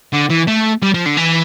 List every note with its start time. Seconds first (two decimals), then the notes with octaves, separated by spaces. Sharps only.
0.13 D3
0.30 E3
0.47 A3
0.82 G3
0.94 F3
1.06 D3
1.17 E3